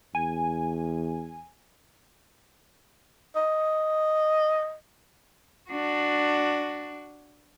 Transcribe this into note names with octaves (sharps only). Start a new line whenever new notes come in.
E2 G#5
D#5
D4 F#4